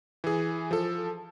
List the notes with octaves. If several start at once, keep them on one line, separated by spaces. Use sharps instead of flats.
E3 G#4
F3 A4